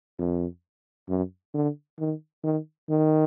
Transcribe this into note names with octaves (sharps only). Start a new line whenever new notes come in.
F2
F#2
D3
D#3
D#3
D#3